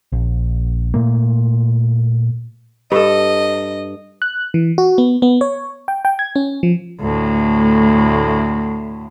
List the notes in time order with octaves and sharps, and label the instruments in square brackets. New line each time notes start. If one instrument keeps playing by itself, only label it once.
[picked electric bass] A#1
A#2 A3 A#3
[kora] G2 A4 [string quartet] D#5
[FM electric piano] F#6
E3
F#4
B3
B3
C#5
G5
G5
G#6
C#4
F3
[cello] D2 A2